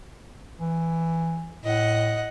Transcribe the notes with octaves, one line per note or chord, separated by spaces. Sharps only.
E3
A2 D#5 F#5